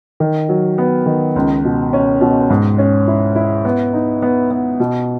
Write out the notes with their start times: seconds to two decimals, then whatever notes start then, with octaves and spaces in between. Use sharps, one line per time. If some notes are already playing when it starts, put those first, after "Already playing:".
0.20 D#3
0.49 F#3
0.78 B3
1.06 D#3
1.36 C#2
1.65 B2
1.93 C#4
2.21 B2
2.50 G#2
2.78 C#4
3.08 E4
3.36 E4
3.65 B3
3.93 D#4
4.22 B3
4.51 B3
4.80 B2